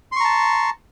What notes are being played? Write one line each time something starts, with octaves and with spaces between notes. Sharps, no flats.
A5 A#5 C6 C#6